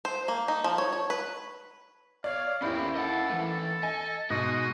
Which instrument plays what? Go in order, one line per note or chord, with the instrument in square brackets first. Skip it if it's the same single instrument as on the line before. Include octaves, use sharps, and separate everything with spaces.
[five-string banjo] C5
A#3
D#4
F3
C#5
C#5
B4
[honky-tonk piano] C#5 D5 [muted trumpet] F5
[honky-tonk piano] D#2 E4 B5 [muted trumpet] C4 [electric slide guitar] C#4 G4
[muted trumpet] A4 [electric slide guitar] D#5 F#5
[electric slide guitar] E3 A3
[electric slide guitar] D#5 [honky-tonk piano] G#5
[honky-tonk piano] G#2 B2 [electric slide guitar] F#4 [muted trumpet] D#5